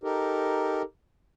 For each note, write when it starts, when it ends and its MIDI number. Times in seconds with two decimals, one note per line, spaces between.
0.04 0.82 63
0.04 0.82 67
0.04 0.82 69
0.04 0.82 70